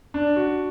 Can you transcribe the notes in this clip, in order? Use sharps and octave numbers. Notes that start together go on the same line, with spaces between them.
D4
F#4